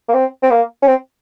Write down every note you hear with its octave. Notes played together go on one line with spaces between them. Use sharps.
A#3
C4
C4
A#3
C#4
C4